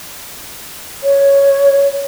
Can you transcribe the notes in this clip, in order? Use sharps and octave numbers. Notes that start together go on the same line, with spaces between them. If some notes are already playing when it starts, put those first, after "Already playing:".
C#5